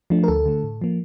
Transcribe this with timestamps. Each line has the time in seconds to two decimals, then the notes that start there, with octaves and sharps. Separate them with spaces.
0.10 F3 A3 D4
0.24 A#4
0.28 D2 A4
0.45 D3 A3
0.63 A2
0.81 F3 A#3